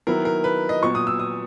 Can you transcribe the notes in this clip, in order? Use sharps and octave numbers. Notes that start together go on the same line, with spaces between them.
D#3 F#3 B3 E4 A#4
A#4
B4
D#5
A#2 F#3 B3 C#6
D#6
E6
D#6